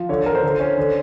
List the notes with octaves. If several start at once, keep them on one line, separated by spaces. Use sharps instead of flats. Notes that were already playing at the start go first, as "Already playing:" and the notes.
Already playing: F3
D3 C#5
D3 A#4
C5
D3
C#4
D3